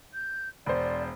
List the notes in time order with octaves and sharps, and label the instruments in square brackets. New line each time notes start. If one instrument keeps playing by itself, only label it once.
[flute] G6
[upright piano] E1 C5 [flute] D5